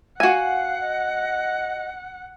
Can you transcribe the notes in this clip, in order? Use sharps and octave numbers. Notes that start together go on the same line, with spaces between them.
F#4 F5 F#5 G#5
D#5